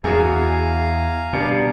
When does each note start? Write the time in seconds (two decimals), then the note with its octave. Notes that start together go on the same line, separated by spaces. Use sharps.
0.04 E2 F#4 G#4 F5 G#5 A#5
1.33 B2 G3 D4